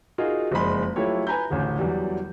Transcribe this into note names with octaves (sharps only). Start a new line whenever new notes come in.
D#4 F4 F#4 G#4 A#4 F5
F#1 F2 G#3 D5 B5 C6
F#3 A3 E4 F4 G4 C#5
B4 G#5 A#5 B5 G6
A1 D2 C#3
E2 F#3 G3